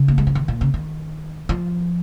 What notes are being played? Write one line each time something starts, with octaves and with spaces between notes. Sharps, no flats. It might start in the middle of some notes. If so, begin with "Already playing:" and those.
Already playing: C#3
A#3
G#3
F3
D#3
A#2
C#3
D#3
F3